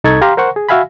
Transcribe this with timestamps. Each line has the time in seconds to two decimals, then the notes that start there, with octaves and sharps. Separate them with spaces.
0.04 C2 D#4 A4 A5 C#6 G#6
0.21 G4 F5 A#5 C6
0.37 A#4 C5 F#5 C#6
0.56 G#4
0.69 F#4 E5 F5 G#5 B5